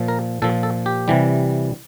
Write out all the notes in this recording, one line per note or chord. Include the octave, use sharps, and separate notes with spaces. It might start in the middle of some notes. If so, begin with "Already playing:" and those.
Already playing: A#2 F3
A#4
A#2 F3 A4
A4
G4
C3 E3 G3